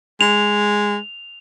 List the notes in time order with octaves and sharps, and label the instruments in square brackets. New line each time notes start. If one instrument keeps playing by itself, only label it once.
[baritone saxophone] G#3 [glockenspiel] F7